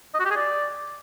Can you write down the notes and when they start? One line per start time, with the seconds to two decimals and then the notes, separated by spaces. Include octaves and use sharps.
0.14 D#5
0.20 F#4
0.25 G4
0.31 G#4
0.36 D5